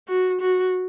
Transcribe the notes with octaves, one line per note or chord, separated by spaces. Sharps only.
F#4
F#4